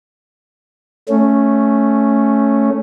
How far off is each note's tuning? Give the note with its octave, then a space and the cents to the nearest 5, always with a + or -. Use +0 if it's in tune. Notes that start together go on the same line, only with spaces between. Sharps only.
A3 +0 C#4 +0